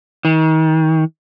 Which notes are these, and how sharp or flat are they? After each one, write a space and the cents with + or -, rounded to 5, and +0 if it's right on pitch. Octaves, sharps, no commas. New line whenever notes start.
D#3 +35